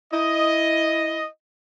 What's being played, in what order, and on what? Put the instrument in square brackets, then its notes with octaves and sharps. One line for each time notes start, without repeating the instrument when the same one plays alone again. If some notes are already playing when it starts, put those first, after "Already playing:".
[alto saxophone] E4 [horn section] D#5